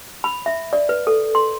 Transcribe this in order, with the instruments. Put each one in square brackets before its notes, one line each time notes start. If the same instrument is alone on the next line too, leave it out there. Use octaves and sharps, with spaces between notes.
[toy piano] B5
E5
D5
B4
A4
C6